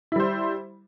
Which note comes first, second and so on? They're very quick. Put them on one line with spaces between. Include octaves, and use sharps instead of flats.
E4 G3 C5